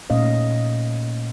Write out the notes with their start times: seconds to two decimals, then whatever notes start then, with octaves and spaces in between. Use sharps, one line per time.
0.10 A#2 A3 C#4 D#5 F5